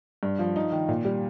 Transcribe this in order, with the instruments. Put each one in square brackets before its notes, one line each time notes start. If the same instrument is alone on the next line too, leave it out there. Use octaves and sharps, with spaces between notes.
[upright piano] G2
F3
D#4
D#3
A#2
G3